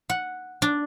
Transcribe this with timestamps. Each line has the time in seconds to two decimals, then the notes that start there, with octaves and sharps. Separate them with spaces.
0.10 F#5
0.62 D4